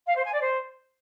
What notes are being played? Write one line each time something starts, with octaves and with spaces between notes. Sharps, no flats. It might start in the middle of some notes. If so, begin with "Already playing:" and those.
F5
C5
G#5
D5
C5